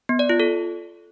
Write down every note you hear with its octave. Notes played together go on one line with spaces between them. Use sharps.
B3
D5
F4
A4